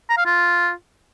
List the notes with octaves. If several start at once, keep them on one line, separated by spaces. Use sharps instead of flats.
A#5
F5
F4